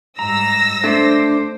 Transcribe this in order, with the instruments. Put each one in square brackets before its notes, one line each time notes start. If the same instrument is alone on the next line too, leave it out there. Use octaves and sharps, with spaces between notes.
[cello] G#2 G3 [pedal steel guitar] A#5 [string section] E6 A#6
[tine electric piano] A3 [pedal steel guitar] D4 [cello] C5